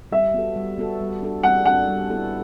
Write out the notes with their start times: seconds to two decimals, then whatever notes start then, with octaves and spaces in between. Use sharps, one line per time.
0.12 G3 E5
0.34 B3 F#4 A4
0.56 G3
0.78 B3 F#4 A4
1.00 G3
1.22 D4 F#4 A4
1.43 G3 F#5
1.65 D4 F#4 A4 F#5
1.88 G3
2.10 B3 E4 A4